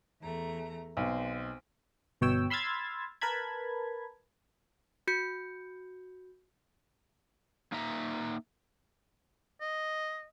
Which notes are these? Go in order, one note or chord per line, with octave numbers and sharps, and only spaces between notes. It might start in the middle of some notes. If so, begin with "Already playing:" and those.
E2 A3 A#5
B1 C4
G1 B2 C#5 G5 E6
B5 C6 E6 F6 G#6 A6
A#4 B4 A5 B5 G#6
F#4 G6 C#7
A#3 D#4 E5 A#5
D#5